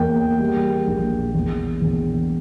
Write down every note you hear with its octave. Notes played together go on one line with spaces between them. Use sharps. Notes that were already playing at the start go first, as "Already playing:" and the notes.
Already playing: E2 A#3 G5
G3
A#1
E2
E2